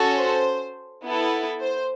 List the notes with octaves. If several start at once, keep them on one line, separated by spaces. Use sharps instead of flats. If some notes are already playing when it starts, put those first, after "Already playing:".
Already playing: C#4 F#4 A4
C5
B3 E4 A4
C5